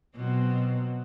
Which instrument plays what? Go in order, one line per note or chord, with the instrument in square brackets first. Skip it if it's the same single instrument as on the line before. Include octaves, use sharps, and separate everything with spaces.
[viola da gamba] B2 F#3 C4